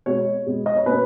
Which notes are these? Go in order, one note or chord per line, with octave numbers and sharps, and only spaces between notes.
B2 G#3 B3 C#5
B2 G#3 B3
D#5
C#5
B2 A#3 C#4 B4